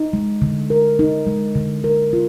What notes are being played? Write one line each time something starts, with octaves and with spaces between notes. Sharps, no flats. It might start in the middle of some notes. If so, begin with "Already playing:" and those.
Already playing: D#4
G#3
D3
A#4
D#4
G#3
D3
A#4
F4